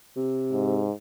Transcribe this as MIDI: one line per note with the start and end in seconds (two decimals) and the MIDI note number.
0.16 0.85 48
0.53 0.92 44